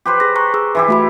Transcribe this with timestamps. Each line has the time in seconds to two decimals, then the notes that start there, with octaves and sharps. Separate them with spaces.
0.05 G4 B4 C5
0.20 G#4 A#6
0.36 A#5 C#6 F#6
0.54 G#4 E6
0.75 E3 E4 G4
0.88 A3 F#4 B5